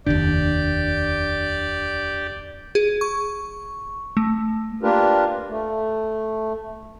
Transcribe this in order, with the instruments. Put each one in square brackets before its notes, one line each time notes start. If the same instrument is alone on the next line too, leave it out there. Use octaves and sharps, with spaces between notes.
[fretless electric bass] F1 D#2 [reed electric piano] D4 [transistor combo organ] G4 [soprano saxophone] D5
[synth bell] G#4
C#6
A3
[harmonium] A#3 D4 F4 G4 A#4 B4
A3